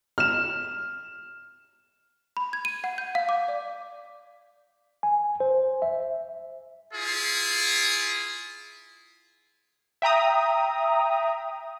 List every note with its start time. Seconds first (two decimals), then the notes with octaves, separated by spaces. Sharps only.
0.18 F6 E7
2.37 B5
2.53 G#6
2.65 D#7
2.84 F#5
2.98 G6
3.15 F5
3.29 D6
3.48 D5
5.03 G#5
5.40 C5
5.82 E5
6.92 E4 F4 G#4
10.02 E5 G5 A#5 D#6